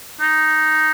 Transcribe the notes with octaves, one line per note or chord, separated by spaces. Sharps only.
D#4